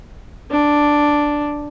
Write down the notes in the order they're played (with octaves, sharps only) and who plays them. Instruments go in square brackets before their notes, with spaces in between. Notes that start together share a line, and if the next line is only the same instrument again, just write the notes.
[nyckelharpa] D4